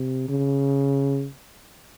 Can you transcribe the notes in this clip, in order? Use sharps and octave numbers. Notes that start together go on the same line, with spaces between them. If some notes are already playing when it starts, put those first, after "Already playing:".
Already playing: C3
C#3